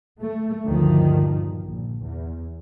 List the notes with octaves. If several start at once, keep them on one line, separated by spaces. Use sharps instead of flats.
A3
D2 G2 A#2 D#3 F3
A#1
E2